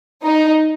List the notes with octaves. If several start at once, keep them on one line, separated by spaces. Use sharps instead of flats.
D#4